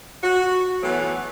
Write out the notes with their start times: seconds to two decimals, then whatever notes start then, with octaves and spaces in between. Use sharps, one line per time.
0.23 F#4
0.83 E3 F#3 A3 B3